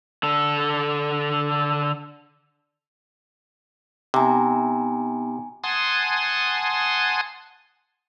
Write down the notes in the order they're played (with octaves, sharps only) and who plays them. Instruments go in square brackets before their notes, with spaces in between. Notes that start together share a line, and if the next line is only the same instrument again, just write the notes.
[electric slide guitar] D3 A4
[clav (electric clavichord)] C3 [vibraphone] B3 D#4 [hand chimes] G#5 A#5
[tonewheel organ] F#5 G#5 A5 C6 D#6